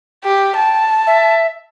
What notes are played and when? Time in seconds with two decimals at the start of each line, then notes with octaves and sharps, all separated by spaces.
0.24 G4 G5
0.56 A5
1.06 E5